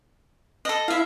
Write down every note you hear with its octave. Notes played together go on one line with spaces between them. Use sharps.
A4 D#5
E4 E5 F5